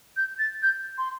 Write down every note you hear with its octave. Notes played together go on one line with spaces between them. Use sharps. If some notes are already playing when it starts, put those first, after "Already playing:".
G6
A6
G6
C6